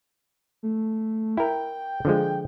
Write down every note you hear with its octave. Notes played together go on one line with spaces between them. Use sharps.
A3
E4 A#4 G5
D3 F3 G#3